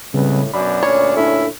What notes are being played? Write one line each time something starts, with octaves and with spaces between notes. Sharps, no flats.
C#2 A2 C#3 G3 C4 B4
F#2 B2 F#3 D4 B5
D2 A#2 C#4 C#5
D4 E4 A4